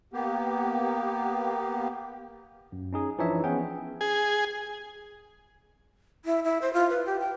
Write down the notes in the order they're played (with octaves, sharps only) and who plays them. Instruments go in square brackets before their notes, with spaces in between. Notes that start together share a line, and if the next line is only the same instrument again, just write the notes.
[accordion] A#3 B3 G4
[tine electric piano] F#2
C#4 D#4 G#4
E3 F3 D4 D#4 C#5 E5
B3 C#4 G#4 G5
[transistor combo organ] G#4
[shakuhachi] E4
E4
C5
F4
B4
G4
G5